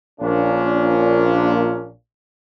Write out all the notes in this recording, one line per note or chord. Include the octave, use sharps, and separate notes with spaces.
A#1 A#2 C#4 D4